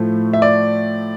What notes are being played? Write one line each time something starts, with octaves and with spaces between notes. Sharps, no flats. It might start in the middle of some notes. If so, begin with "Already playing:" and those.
Already playing: A2 F3 A3
E5
D5